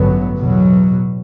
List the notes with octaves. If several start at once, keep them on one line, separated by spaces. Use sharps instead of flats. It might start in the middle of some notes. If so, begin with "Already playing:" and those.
Already playing: A1 G2 D3 F#3 B3
E2 B2 F#3